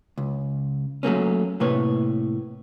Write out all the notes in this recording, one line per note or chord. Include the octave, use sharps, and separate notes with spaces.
C#2
F#3 A3 A#3 C#4
A2 C3 A#3 B4 C#5